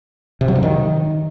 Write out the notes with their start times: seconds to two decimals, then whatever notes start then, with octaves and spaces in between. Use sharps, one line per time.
0.41 C3
0.48 F#3
0.55 G2
0.63 D#3